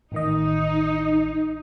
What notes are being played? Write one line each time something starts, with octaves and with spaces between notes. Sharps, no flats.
A1 D#3 D#4 D#5